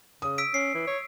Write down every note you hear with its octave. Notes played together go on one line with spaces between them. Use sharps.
C#3 D#6
E6 B6 D7
C#4 C7
E3
C#5